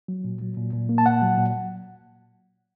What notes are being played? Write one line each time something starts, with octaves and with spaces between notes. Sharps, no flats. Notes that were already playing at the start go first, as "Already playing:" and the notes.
F#3
A#2
F#3
A#2
A#2
A#3
A5
A#2 F#5
F#3
A#2